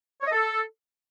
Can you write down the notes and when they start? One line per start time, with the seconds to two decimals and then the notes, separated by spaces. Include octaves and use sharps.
0.21 C#5
0.27 D#5
0.32 A4